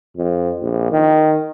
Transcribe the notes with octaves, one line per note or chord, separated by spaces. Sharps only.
F2
A#1
D#3